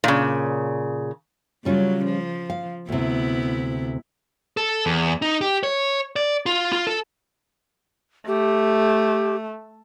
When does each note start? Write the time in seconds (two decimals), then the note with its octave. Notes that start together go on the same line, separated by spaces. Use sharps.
0.04 A#2 C#3
1.65 C#3 F#3 G3 C#4 F4
2.05 F3
2.50 F5
2.89 D2 C3 B3 E4
4.57 A4
4.86 E2
5.22 D#4
5.41 G4
5.63 C#5
6.16 D5
6.46 F4
6.73 F4
6.87 A4
8.27 A3 G4